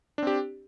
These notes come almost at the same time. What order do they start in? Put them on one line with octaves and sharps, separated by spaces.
D4 C4 G4